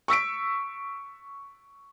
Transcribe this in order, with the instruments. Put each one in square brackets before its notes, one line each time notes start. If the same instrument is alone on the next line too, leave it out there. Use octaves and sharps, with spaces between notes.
[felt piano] C#6 E6 B6 D7